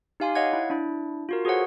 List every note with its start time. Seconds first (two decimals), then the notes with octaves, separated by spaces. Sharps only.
0.20 D#4 G4 F5 G#5 C6
0.35 C#5 D#5 F5 F#5 G#6
0.53 E4
0.70 D4 E4
1.29 F4 F#4 A#4
1.45 F#4 G#4 A4 C5 C#5 F#5